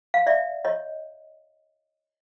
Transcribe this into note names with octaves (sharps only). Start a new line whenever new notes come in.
F5
D5 E5
C#5 D#5